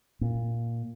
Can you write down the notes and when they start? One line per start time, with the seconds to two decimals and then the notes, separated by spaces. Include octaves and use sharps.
0.21 A#2